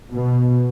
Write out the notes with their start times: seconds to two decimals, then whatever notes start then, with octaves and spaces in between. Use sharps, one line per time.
0.13 B2